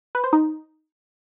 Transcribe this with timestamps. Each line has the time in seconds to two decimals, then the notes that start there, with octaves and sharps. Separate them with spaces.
0.15 B4
0.24 C5
0.33 D#4